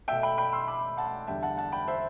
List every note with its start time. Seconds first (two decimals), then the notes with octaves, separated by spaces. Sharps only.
0.08 B2 A3 E5 G5
0.23 G5 B5
0.38 G5 B5
0.53 C6 E6
0.68 B5 D6
0.97 F#5 A5
1.27 E2 D3 G3 E5 G5
1.43 F#5 A5
1.57 F#5 A5
1.72 G5 B5
1.88 C5 E5